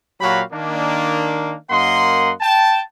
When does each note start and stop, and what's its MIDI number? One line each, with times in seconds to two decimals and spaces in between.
0.21 0.42 46
0.21 0.42 54
0.21 0.42 66
0.21 0.42 67
0.21 0.42 77
0.21 0.42 83
0.52 1.55 51
0.52 1.55 58
0.52 1.55 62
1.70 2.31 42
1.70 2.31 58
1.70 2.31 75
1.70 2.31 78
1.70 2.31 84
2.41 2.81 79
2.41 2.81 81